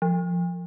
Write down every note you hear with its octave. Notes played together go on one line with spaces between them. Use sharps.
F3